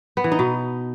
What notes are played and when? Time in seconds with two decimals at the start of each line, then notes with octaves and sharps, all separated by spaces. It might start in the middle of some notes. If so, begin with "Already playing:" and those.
0.17 B3
0.24 E3
0.32 D#4
0.39 B2